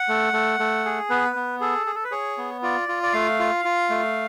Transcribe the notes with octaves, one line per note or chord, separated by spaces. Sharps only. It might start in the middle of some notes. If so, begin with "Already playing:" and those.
Already playing: F#5
A3
A3
A3
G#4
B3 B4
B3
G#4 A4
G#4
A4
B4
G#4 C#5
B3
F4 D5
F4
D5
A3 F5
F4
F4
A3